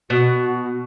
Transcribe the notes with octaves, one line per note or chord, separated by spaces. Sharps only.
B2 F#4